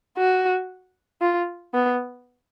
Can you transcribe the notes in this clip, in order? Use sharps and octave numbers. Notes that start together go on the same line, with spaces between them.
F#4
F4
B3